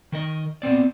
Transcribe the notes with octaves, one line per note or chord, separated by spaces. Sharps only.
D#3 A#4 D#5
A#2 B3 C4 D5